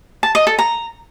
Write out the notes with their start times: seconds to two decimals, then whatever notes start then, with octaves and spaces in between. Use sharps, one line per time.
0.23 A5
0.35 D#5
0.47 A4
0.59 A#5